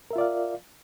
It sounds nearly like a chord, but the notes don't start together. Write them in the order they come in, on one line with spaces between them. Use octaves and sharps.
A#4 E5 F4 D5 F5